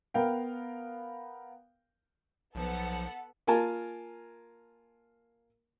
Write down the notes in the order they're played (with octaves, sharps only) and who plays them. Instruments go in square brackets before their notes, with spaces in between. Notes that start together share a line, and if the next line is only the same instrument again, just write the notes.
[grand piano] B3 A#4 F5 G5
[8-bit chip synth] B1 F3 [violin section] B3 A4 F#5
[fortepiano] A#3 F4 A#4 G#5 A5